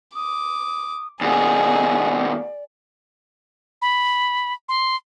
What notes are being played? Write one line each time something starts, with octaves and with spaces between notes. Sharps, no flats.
D6 D#6
D#2 B2 G#4 D5
B5
C6